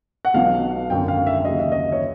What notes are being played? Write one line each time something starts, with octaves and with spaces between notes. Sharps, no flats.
F#5
B1 B2 F#3 F5
G#1 F#2 D3 G5
F5
E5
D#2 C#3 F#3 D#5
E5
D#5
C#5